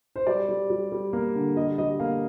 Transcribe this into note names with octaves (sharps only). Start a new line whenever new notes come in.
C5
G3 D5
G3
G3
G3
A#3
D3
G3 D#5
G3 D#5
A#3 F5